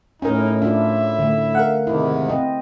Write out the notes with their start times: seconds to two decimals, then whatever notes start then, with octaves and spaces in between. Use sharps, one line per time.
0.22 A2 C#4 D#4 A#4
0.62 D4 F4 E5
1.19 D3 A3
1.55 A#4 F5 F#5
1.87 G#2 C3 D#3 E4
2.29 C4 D#5